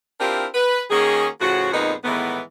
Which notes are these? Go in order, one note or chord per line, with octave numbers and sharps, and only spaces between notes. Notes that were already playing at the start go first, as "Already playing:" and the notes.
C4 D4 E4 F4 G4 A#4
B4
D#3 A#3 C#4 F#4 G#4
A2 C#3 F3 F#4
F2 A#2 G#3 B3 D#4
A2 D#3 E3 G#3 B3